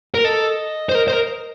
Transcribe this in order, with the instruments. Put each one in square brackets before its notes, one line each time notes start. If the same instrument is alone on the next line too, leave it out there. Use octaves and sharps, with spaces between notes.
[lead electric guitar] A#4
[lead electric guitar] A4 [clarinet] D#5
[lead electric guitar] C5
A#4
C5
A#4